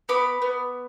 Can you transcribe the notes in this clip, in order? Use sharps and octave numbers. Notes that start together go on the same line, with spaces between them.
B3 B5 D6
B3